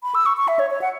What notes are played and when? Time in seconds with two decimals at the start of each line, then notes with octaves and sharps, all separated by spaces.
0.03 B5
0.15 E6
0.26 C#6
0.37 C#6
0.48 E5
0.59 C#5
0.70 C#5
0.81 F#5